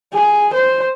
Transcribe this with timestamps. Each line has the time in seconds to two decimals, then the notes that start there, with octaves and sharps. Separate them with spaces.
0.13 G#4
0.53 C5